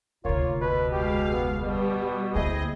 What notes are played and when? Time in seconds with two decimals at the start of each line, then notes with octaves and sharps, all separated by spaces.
0.25 F1 D2 A#3 F4 C#5
0.61 B2 B4
0.92 G#3 G4 F5
1.32 B3
1.61 B2 G3 B3
2.35 D2 A#3 C4 E4 G#4 D#5